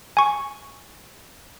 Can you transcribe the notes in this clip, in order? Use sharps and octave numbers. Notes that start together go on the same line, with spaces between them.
G#5 C#6